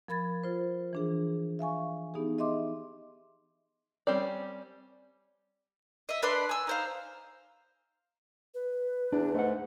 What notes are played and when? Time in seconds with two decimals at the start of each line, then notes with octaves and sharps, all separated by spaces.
0.08 F3 A#4 B5 G#6 A6
0.44 F4 C5
0.93 E3 D4 G#4
1.59 E5 F5 G#5 C#6
2.14 B3 D#4 G4 G#4
2.38 D#5 E5 C6 D6
4.07 G3 C4 C#4 D5
6.09 D#5 E5
6.23 D4 B4 D5 C6
6.49 G#5 E6
6.67 D#4 C5 F5
8.54 B4
9.12 E2 D4
9.34 G#2 A3 F#5